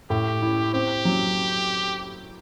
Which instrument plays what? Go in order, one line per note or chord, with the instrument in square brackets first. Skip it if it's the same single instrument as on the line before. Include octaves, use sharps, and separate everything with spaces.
[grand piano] A2 [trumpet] G4
[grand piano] E4
[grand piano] C4 [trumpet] G4
[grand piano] F#3